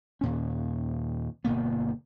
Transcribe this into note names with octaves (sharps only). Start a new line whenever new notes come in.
D#2 A#2 C#4
G1 B2 A#3 B3